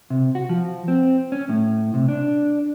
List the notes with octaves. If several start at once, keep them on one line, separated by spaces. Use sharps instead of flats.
C3
F#4
F3
C4
C#4
A2
C3
D4